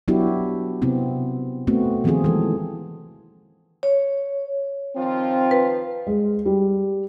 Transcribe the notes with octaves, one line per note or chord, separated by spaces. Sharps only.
F#3 B3 D4 E4 F#4 G4
C3 B3 C4 E4
A3 B3 C4 F#4
D#3 F3 A#3 C4 F4 G#4
E3 F3 G#3 A4
C#5
D#3 F3 C4 F4
B4
G#3
G3